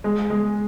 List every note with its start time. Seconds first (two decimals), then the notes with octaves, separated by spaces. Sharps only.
0.04 G#3
0.30 G#3